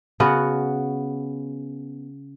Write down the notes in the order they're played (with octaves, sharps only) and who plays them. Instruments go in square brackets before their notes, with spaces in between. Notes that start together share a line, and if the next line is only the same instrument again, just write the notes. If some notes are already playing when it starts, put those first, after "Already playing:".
[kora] C#3 B3 F#4